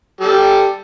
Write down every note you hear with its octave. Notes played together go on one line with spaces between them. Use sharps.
G3 G4 A4